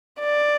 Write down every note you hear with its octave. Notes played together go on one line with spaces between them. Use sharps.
D5